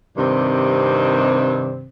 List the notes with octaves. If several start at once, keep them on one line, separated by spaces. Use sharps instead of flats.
G2 C3 D#3 C4